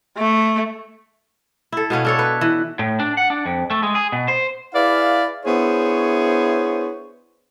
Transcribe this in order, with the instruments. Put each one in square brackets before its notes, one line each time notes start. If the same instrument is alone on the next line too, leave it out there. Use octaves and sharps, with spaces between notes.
[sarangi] A3
[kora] E4 A4
B2 B3 C#4 F5
D4 A4 C#5
B4
E3
[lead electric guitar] A2
D4
F#5
D4
F2
A3
G#3
G#4
B2
C5
[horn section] E4 G#4 B4 D5 F5
B3 D4 E4 G#4 C5 C#5